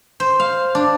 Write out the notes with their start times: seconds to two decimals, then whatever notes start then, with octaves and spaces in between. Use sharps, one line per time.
0.20 C5
0.40 F5
0.75 D4